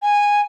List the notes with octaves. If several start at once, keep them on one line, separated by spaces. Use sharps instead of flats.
G#5